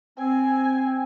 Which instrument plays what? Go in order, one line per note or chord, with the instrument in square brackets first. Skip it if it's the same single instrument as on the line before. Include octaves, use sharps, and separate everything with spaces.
[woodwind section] C4 [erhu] G#5